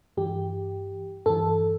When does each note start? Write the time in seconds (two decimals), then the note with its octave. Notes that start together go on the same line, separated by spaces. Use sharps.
0.17 G2 E3 G4
1.26 G2 E3 A4